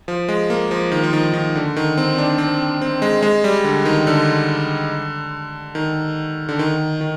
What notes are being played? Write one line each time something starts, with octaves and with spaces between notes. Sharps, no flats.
F3
G#3
A#3
F3
D#3
F3
D#3
D#3
D3
D#3
C4
D4
C4
C4
G#3
G#3
G3
D3
D#3
D3
D#3
D3
D#3
D#3